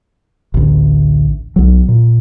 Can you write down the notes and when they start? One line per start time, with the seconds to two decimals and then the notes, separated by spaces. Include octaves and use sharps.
0.54 A1 D2
1.56 B1 F#3
1.88 A#2